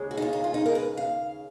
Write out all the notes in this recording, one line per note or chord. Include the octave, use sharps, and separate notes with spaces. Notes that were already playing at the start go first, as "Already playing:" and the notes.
Already playing: D#2 C#3 G#3 C#4
F#4
D#4
F4
D#4
F4
D#4
A#4
B4
F5